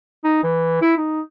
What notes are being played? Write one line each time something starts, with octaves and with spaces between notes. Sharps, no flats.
D#4
E3
E4
D#4